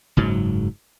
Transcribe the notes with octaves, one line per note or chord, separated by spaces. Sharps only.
F#1 G#2 F#3